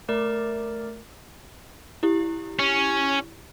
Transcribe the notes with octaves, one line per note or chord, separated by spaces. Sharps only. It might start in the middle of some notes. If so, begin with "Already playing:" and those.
A3 A#4 D5
E4 G4
C#4